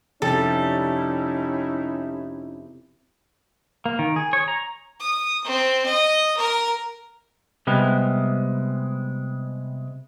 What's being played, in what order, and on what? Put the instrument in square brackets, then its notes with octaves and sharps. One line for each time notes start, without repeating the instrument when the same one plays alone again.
[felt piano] F2 C3 G5 [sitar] G3 [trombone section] C#4 D#4 E4 [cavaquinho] A4
[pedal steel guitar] A#3
D#3
G#4
C#5
A#5
[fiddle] D#6
C4
D#5
A#4
[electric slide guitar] C3 G3 G#3 B3